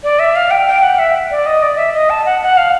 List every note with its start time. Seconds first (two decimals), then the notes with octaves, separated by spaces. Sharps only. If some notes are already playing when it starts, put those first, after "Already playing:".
0.04 D5
0.19 E5
0.36 F5
0.51 G5
0.67 G5
0.83 F#5
0.99 E5
1.31 D5
1.46 D#5
1.62 D5
1.78 E5
1.94 D#5
2.10 A5
2.26 F#5
2.42 F#5
2.57 F5